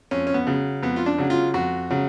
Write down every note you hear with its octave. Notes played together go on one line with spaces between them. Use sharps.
F2 C#4
C#4
B3
C#3 F#3
F2 B3
F4
D4
C#3 F#3
F4
F2 F#4
C#3 F#3